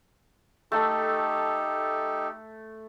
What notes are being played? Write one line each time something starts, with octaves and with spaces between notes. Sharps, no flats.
A3 D#4 G4 A4